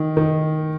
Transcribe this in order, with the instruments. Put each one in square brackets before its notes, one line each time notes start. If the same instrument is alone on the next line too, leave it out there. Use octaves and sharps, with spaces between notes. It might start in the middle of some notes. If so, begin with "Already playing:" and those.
Already playing: [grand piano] D#3
D#3